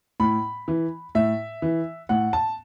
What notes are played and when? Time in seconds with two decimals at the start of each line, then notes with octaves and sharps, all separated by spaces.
0.20 A2 B5
0.68 E3
1.15 A2 E5
1.62 E3
2.09 A2 F#5
2.33 A5